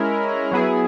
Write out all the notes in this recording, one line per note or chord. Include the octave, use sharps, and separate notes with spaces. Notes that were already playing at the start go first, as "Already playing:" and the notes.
Already playing: G#3 C#4 E4 A#4
F#3 B3 E4 G#4